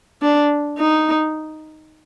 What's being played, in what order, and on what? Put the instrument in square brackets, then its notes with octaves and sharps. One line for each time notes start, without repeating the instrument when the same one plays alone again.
[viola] D4
D#4